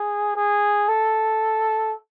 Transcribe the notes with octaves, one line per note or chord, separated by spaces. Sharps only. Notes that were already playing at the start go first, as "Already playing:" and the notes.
Already playing: G#4
G#4
A4